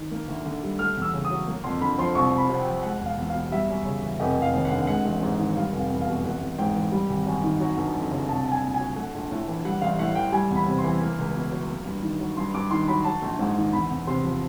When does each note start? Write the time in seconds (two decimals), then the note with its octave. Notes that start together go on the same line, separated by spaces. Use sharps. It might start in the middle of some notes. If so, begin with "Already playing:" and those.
Already playing: D#3
0.11 A#3
0.28 D2
0.45 D3
0.63 G3
0.79 A3 F6
0.97 E2
1.02 E6
1.13 C#3
1.25 D#6
1.31 F#3
1.47 A#3
1.64 F2 C6
1.81 D3 B5
1.98 F3 C6
2.15 C2 C#6
2.32 C2
2.38 B5
2.49 C3
2.54 F#5
2.61 G5
2.67 F3
2.83 G#3 F#5
3.00 E1
3.06 F5
3.17 E2
3.30 B2 F5
3.51 G3 E5
3.69 F#2
3.85 C#3
4.03 E3
4.20 F1 D#5
4.37 F1 F5
4.53 D#2
4.65 F#5
4.71 D3
4.87 G#3 F#5
5.05 A1
5.23 G#2
5.40 D#3
5.56 G3 F5
5.72 F1
5.79 F5
5.90 E2
6.02 F5
6.07 B2
6.24 A1 F#5
6.42 A1
6.58 G#2 G5
6.75 E3
6.92 G3
7.09 G#1
7.27 F#2
7.44 D#3
7.60 F#3
7.77 G1
7.95 F2
8.11 C#3
8.29 C2 A5
8.44 C2 A5
8.52 G#5
8.63 A#2
8.74 F#3 G#5
8.96 A3 F#5
9.14 A#1
9.31 A2
9.48 E3
9.65 G3 F#5
9.82 A1 F5
9.98 A2 F#5
10.15 E3 G5
10.32 G3 G#5
10.50 E2
10.56 B5
10.66 C3
10.78 C6
10.84 E3
11.01 A#3
11.18 C#2
11.35 B2
11.52 F#3
11.69 A#3
11.85 G2
12.03 D#3
12.20 F#3
12.37 G2 C6
12.54 G2 D6
12.71 D#3 C6
12.88 F#3 B5
13.05 F#3 A5
13.22 A#1
13.39 G#2
13.57 D#3
13.73 E2 B5
13.91 E2
14.07 C3 C6
14.24 F3